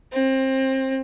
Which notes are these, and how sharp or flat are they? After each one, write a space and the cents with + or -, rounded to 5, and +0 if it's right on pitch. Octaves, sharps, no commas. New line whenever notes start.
C4 +25